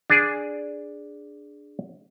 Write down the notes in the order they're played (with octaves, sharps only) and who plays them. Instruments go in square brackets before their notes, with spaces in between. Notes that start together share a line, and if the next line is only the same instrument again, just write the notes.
[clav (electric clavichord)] D4 G#4